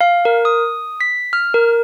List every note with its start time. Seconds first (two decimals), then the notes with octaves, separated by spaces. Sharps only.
0.01 F5
0.25 A#4
0.45 D#6
1.01 B6
1.33 F6
1.54 A#4